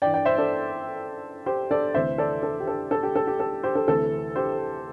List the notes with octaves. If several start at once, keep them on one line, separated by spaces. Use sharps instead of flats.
G2 E3 D5 G5
D5 G5
C5 E5
A4 D5
G4 C5
A4 D5
D2 C3 E3 C5 E5
A4 D5
A4
G4
A4
A4
G4
A4
G4
A4
G4 C5
A4
D2 C3 E3 A4
G4 C5